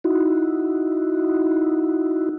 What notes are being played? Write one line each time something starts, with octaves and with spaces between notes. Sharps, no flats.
D#4 E4 F#4